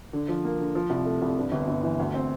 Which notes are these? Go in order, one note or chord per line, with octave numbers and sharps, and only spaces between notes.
D3
F3
A#3
D3
F3
C2
A3
C2
G2
G1
G1
E3
D2
C4